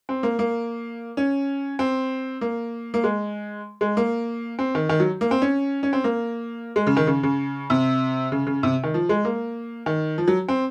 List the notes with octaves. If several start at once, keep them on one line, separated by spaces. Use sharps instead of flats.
C4
A#3
A#3
C#4
C4
A#3
A#3
G#3
G#3
A#3
C4
D#3
D#3
F#3
A#3
C4
C#4
C#4
C4
A#3
G#3
C#3
D#3
C#3
C#3
C3
C#3
C#3
C3
D#3
F3
G#3
A#3
D#3
F3
F#3
C4